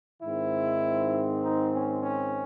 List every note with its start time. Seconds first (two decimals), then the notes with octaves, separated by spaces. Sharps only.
0.22 G#2 D#3 G#3 C4 E4
1.42 D#4
1.73 C#4
2.03 C#4